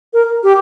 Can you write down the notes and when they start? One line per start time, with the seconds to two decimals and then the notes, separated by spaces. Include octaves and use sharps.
0.13 A#4
0.43 G4